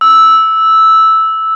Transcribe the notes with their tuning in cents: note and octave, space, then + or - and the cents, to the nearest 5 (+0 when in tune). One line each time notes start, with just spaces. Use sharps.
E6 -10